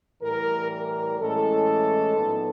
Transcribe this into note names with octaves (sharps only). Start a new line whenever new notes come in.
A2 E3 G3 A#4
A#4
A2 E3 G#3 C#4 A4
A#2 F#3 B3 D#4